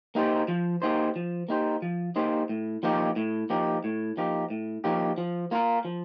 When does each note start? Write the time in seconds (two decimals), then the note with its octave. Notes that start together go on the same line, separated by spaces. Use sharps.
0.15 A#3 D#4 G4 C5
0.48 F3
0.82 A#3 D#4 G4 C5
1.16 F3
1.49 A#3 D#4 G4 C5
1.82 F3
2.16 A#3 D#4 G4 C5
2.49 A2
2.83 F3 A#3 D#4 G4
3.16 A2
3.50 F3 A#3 D#4 G4
3.84 A2
4.17 F3 A#3 D#4 G4
4.50 A2
4.84 F3 A#3 D#4 G4
5.18 F3
5.51 A#3 F4 A#4
5.85 F3